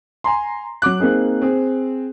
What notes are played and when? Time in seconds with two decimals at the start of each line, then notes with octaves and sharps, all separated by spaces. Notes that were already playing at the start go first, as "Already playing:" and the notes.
0.24 G#5 A#5 C6
0.82 F#3 F#4 D6 F#6
1.00 A#3 C4 D#4 G#4
1.42 C4 G#4